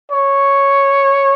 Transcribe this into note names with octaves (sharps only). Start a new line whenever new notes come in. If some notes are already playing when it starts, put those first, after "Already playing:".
C#5